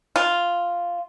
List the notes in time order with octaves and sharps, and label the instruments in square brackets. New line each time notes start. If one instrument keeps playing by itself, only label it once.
[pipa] F4